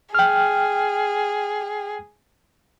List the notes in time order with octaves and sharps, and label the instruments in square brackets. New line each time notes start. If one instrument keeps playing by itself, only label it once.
[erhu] G#4 [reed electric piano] G5 F6